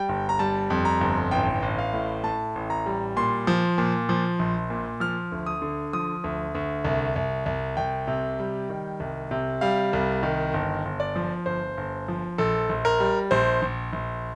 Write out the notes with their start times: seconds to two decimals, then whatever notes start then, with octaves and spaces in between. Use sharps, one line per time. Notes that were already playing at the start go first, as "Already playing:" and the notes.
Already playing: G3 G5
0.09 G1
0.29 A#5
0.39 G3 A5
0.70 F2
0.85 A#5
1.01 G1
1.31 A1 G5
1.62 A1
1.78 F5
1.93 A2
2.23 A2 A5
2.55 A1
2.70 A#5
2.86 G3
3.16 A#2 C6
3.47 F3
3.78 A#2
4.09 F3
4.39 A#1
4.70 A#2
5.00 F3 F6
5.32 D2
5.46 D#6
5.62 D3
5.93 F3 D#6
6.24 D2
6.55 D2
6.85 C2
7.16 C2
7.46 C2
7.77 C2 G5
8.08 C3
8.40 G3
8.69 D#3
9.00 C2
9.31 C3
9.61 G3 F5
9.93 C2
10.23 D#3
10.54 G1
10.85 G1
11.00 D5
11.16 F3
11.46 G1 C5
11.77 G1
12.08 F3
12.38 A#1 A4
12.69 A#1
12.85 A#4
13.00 G3
13.31 A#1 C5
13.62 A#1
13.93 A#1